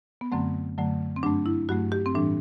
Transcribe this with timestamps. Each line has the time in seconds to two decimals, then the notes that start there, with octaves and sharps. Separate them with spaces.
0.21 B3
0.32 F#2 D3 F#3 A3 C4
0.78 F#2 D3 F#3 A3
1.16 C4
1.23 G2 F#3 A3 D4
1.46 E4
1.69 G2 F#3 A3 F#4
1.92 G4
2.06 C4
2.15 A2 E3 G3 D4